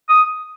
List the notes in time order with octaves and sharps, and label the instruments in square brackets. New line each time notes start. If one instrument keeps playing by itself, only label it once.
[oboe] D#6